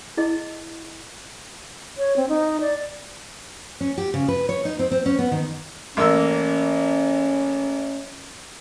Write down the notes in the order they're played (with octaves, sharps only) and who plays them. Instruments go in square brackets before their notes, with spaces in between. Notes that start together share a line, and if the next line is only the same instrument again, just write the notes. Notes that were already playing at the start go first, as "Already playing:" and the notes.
[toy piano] E4 G#4 D#5
[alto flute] C#5
C4
D#4
D5
[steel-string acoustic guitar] C#4
G4
C#3
B4
C#5
D#4
C4
C4
C#4
B3
D#3
[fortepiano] A1 A#3 E6 [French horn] C#4